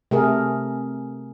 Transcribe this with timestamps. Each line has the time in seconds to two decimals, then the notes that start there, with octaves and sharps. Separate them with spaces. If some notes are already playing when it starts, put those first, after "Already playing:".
0.11 C3 A3 G#4 A#4